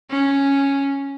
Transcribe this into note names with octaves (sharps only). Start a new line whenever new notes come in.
C#4